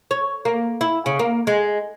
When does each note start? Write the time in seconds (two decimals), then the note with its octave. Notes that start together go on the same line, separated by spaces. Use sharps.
0.11 C#5
0.45 A#3
0.81 E4
1.06 C#3
1.19 A#3
1.47 G#3